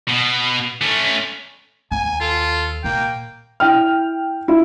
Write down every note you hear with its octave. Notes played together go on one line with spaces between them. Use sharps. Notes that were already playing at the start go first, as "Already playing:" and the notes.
B2
A3 C#4
D#2 G#5
F4 A4
A#2 A#3 G5
E4 G5 F6
E4 F4